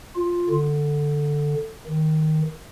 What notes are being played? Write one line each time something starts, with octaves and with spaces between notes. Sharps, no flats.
F4
D3
D#3